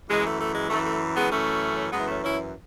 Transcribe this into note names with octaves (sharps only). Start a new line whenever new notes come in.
F#2 E3 G#3
A3
A3
G#3
F#2 E3 A3
A3
G#3 B3
F#2 E3 A3 C#4
F#2 E3 G#3 B3
A3 C#4
C#4 E4